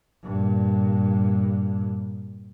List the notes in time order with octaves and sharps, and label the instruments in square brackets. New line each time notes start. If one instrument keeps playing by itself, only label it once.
[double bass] G2 A#2